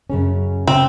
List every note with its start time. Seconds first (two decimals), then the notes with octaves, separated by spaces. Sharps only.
0.10 F#2 C#3 C#4
0.67 C#3 C4